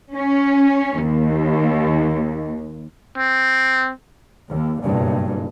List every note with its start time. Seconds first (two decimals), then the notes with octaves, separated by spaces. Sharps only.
0.15 C#4
1.02 D#2
3.18 C4
4.49 D#2
4.83 F#1 B1 G2